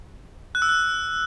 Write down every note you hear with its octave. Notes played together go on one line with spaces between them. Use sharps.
F#6
E6
F#6